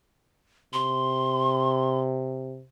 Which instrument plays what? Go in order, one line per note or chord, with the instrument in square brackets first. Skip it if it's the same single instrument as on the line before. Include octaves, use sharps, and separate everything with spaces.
[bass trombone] C3 [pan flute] C6